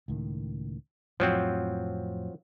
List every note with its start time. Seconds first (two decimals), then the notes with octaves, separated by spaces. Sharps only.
0.08 C#2 A2 D#3
1.20 F2 A2 F3 F#3 C4